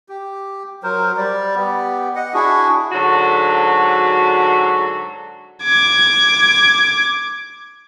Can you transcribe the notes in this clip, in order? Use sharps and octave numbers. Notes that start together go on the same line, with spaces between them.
G4
F#3 A#4 C5
G3 D5
B3 G4
D#5 F#5
D4 E4 F#4 G#4
G#2 D3 F#3 F#4 A5
D6 G#6